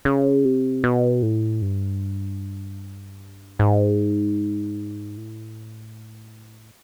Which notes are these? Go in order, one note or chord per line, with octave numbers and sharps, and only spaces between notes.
C#3
C3
B2
A2
G2
G#2
A2